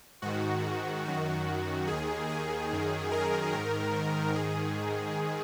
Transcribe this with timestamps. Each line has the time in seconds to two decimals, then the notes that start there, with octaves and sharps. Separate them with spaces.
0.22 G#2 D#3 F#4
1.04 F#2 D#3 F#4
1.87 D#2 D#3 G#4
2.29 G#4
2.71 F#2 D#3
3.12 A#4
3.54 G#2 D#3
4.35 G#2 D#3 G#4